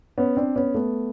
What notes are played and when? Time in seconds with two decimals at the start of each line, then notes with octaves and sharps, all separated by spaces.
0.18 B3 C#4
0.37 C4 D4
0.56 B3 C#4
0.74 A3 B3